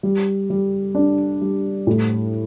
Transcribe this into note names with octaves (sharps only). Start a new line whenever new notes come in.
G3
G3
D4
G3
A2